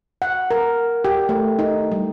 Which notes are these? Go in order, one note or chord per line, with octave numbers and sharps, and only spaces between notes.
F#5
A#4
G4
A3
D#4
G3